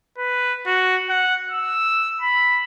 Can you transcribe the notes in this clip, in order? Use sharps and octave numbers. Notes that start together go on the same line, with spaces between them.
B4
F#4
F#5
E6
B5